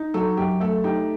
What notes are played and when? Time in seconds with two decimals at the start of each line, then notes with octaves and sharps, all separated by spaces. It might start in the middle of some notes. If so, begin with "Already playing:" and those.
Already playing: D#4
0.14 F#3 A4
0.37 F#2 G4
0.60 A3 A4
0.84 D#4 G4